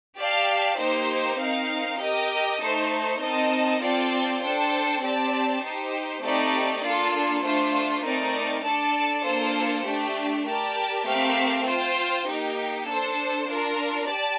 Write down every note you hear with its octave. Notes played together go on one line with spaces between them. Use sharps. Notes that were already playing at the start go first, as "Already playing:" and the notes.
G4 D5 F5 A5
A#3 D#4 G4 C5
C4 D#4 A#4 F5
G4 A#4 D#5
A3 D#4 A4 C5
C4 D#4 A#4 D#5 A5
C4 F4 A4 D5 G5
D4 A4 C5 G5
C4 G4 D5 A5
D#4 G4 C5
A3 C4 D#4 G4 D5
A#3 D4 F4 A4
A3 D4 F4 C5
A3 C4 D#4 A#4 D5
D4 A4 D5 A5
A#3 D4 F4 A4 C5
A3 D4 G4
G4 A#4 D5 A5
A3 C4 G4 A#4 F5
F4 C5 G5
A#3 D#4 G4
D4 A4 C5
D4 F4 A#4
G4 D5 A5